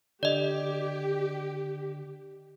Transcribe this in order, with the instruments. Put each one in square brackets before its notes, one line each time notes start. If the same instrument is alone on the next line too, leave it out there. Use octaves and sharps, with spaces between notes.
[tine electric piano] D3 [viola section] G4 [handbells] D5 D#5